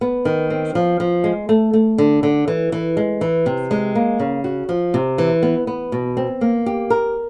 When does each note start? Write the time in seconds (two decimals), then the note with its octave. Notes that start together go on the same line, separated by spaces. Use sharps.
0.01 B3
0.25 D#3
0.50 C4
0.75 F3
1.00 F3
1.24 G#3
1.49 A3
1.73 A3
1.98 D3
2.23 D3
2.48 E3
2.72 E3
2.97 G#3
3.21 E3
3.46 C3
3.71 G#3
3.95 A#3
4.20 C#3
4.44 F#4
4.69 F3
4.94 C3
5.18 E3
5.43 B3
5.67 B3
5.92 B2
6.17 C4
6.41 A#3
6.66 G4
6.90 A#4